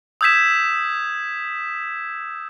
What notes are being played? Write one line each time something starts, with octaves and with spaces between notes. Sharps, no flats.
D#6 E6 G6 G#6 B6 E7